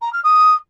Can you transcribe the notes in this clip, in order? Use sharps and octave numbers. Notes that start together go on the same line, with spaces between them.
A#5
F6
D#6